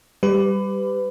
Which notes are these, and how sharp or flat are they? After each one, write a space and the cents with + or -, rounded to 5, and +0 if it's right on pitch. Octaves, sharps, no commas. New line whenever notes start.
G3 +0 B4 +25